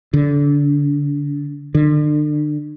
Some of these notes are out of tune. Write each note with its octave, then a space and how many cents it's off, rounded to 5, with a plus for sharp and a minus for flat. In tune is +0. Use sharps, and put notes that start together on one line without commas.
D3 -30
D3 +35